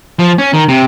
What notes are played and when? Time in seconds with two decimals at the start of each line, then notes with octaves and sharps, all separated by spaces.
0.19 F3
0.38 C#4
0.53 D#3
0.69 C3